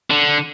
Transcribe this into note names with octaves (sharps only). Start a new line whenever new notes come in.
D3